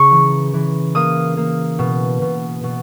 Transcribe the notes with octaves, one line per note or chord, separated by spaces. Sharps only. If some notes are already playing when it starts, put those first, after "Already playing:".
Already playing: C#3 A#5 C#6
E3
E3
A#3 D#6
A#3
B2
B2
B2